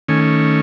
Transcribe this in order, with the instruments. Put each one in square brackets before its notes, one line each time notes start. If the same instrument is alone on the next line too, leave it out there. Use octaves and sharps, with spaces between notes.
[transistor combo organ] D#3 A3 C#4 G#5